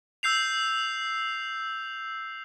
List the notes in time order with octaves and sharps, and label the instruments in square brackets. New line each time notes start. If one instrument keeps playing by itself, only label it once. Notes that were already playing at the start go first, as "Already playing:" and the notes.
[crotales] E6 G6 C7 F7